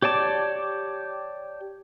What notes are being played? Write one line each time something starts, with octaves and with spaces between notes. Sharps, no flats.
G4 C#5 D5 A5 D6